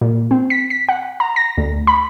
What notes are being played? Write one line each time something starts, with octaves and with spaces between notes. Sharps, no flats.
A#2
C4
B6
B6
F#5
A#5
A#6
D2
B5